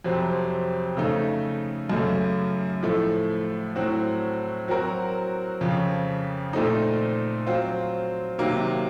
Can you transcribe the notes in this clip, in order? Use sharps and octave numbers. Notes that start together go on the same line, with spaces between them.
F2 C3 F#3 C4
C#3 A3 D#4
F#2 C#3 A3
A2 F3 A3
A2 F#3 C4 F#4
F#3 C4 F#4 A#4
F2 C#3 F3
A#2 A3 C4 D#4
F#3 C4 F4
C3 D#3 F#3 A#3